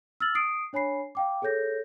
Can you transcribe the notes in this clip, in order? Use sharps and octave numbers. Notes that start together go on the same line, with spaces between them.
E6 F6 A6 F#7
D#6 C7 D7
D4 C#5 G#5 B5 C7
F5 G5 D6
G#4 A4 C#5 G6 A#6